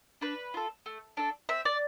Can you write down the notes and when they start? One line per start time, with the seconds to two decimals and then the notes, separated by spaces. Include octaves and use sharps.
0.21 D4 B4
0.54 F4 A4
0.86 A3
1.17 D4 A4
1.49 C4 E5
1.65 D5